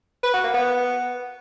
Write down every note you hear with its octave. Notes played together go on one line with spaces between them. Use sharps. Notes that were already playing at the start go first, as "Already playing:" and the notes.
B4
F#4
A#3
B3